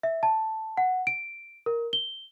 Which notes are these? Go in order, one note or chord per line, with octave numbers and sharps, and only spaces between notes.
E5
A5
F#5
D7
A#4
G7